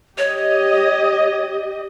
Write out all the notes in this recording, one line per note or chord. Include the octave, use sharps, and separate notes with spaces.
G4 C#5 D#5